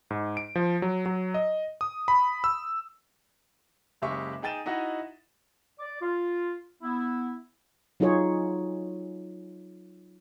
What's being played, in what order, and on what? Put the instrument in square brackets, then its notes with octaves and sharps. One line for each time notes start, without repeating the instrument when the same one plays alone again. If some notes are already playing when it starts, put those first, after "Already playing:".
[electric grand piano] G#2
D7
F3
F#3
F#3
D#5
D#6
B5
E6
[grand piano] F#1 C#3 G#3 G4 E5 C#6
D#4 G#4 G5 A6 D#7 E7
D#4 E4 F#4 D#5 F#5
[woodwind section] D5 D6
F4
B3 E4
[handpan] F#3 D#4 F4 G#4 C#5